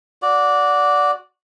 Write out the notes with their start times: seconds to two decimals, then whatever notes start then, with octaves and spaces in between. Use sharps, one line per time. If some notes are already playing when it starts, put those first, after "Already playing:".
0.22 F#4 D5